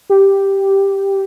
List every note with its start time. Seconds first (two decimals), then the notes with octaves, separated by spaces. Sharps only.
0.10 G4